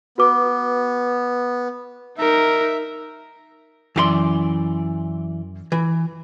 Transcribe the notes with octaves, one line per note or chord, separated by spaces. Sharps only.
B3 F#4 B4 D6
D#4 A#4 E5
F#2 E3 G4 D5 C6
E3